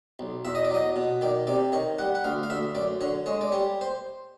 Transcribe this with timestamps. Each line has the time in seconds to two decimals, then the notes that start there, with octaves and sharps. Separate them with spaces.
0.19 B1
0.45 E2 E5
0.55 D#5
0.65 D5
0.70 F#3 D#5
0.96 B2
1.21 D#3 D5
1.47 C3 D5
1.72 D#3 C#5
1.99 G3 F#5
2.15 F#5
2.24 D2 F5
2.43 F5
2.50 D2 E5
2.75 F#2 D5
3.01 D3 C#5
3.26 G#3 C#5
3.41 D5
3.52 G3 C#5
3.81 C5